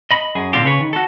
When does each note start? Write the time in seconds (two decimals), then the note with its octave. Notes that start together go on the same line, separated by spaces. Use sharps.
0.11 D#5 B5
0.35 F#2 G#4
0.53 A#2 D3 C4 F4 G4
0.65 C#3 B4 C#5
0.81 D#3
0.93 F#4 A4